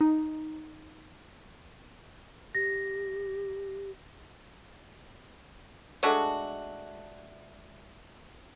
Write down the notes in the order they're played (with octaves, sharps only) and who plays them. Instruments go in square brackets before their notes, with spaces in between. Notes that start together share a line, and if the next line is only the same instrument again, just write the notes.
[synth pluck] D#4
[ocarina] G4 [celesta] A#6
[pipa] G#3 A3 D4 F#4